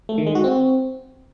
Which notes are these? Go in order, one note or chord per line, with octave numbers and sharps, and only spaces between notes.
A3
D#3
G#3
F#4
C4